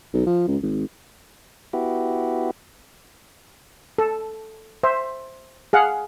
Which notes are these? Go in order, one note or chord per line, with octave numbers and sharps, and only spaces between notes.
B1
F3
C#2
G#1
B3 E4 F#4 G4
A4
C5 E5
G#4 F5 F#5